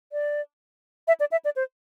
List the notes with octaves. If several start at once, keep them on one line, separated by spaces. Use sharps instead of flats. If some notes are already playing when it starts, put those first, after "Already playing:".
D5
E5
D5
E5
D5
C5